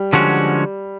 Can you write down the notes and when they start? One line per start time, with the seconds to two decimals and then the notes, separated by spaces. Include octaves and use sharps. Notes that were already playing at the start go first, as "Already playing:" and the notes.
Already playing: G3
0.13 D3 F3 G#3 C#4 F#4